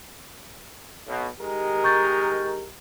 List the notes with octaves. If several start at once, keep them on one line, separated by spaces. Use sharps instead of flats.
B1 B2
D#3 G#3 G4 A#4
C#6 G6 A6